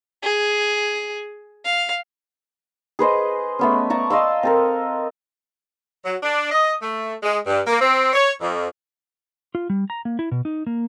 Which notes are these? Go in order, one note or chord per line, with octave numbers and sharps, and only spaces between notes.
G#4
F5
G#4 B4 C5 D#5
A3 B3 C#4
D5 A5 A#5 C#6
D#5 F5 C6 E6
C4 A4 A#4
F#3
D4
D#5
A3
G#3
G2
A#3
C4
C#5
F2
F4
G3
A#5
A#3
E4
B2
D#4
A#3